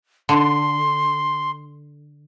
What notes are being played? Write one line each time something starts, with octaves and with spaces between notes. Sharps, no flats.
D3 C6